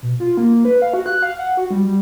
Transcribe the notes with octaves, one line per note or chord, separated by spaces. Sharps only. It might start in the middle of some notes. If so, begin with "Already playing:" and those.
B2
F4
A#3
B4
F5
F#4
F#6
F5
F#5
F#4
G3
G3